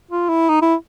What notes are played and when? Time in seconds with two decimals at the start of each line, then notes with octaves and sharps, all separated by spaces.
0.11 F4
0.29 E4
0.49 D#4
0.62 E4